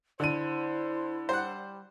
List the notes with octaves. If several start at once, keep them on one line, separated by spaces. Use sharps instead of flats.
D3 E4 C5 D#7
G3 C5 F#5